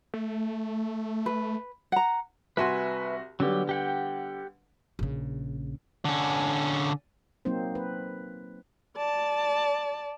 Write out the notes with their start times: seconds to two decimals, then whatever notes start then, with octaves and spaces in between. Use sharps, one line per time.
0.14 A3
1.26 B4
1.92 F#5 A#5
2.57 C2 F#4 B4 E5 G#5 C6
3.40 D3 F#3 G3 B3 G4
3.69 G4 F#5 G5
4.99 A#1 C#3
6.05 D3 C#4
7.45 F#3 A#3 C4 D#4 C5
7.75 B4
8.97 D5 A5